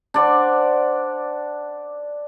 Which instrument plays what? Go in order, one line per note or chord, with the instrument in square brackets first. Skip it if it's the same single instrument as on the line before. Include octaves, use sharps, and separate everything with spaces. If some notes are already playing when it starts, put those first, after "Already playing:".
[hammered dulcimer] D4 C5 D5 F#5